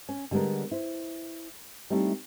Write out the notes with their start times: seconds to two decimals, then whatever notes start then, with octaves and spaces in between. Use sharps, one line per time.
0.09 C#4
0.31 D3 G3 G#3 B3 A#4
0.71 E4 C5
1.90 G3 A3 C4 D#4 E4